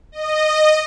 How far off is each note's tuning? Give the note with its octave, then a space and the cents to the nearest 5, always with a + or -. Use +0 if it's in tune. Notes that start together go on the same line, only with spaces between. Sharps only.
D#5 -15